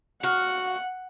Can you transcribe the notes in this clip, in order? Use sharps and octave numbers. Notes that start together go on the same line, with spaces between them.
F#4 F5 F#5